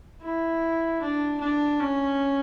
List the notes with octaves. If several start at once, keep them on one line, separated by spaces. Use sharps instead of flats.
E4
D4
D4
C#4